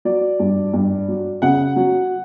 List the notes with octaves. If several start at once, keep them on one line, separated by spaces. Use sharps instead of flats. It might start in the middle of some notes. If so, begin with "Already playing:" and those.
F#3 D5
G2
G2
F#3
C#3 F#5
F#3